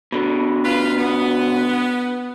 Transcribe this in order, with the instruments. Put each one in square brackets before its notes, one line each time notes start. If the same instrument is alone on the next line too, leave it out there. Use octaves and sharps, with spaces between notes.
[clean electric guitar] B2 D3
[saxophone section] F4 B4
B3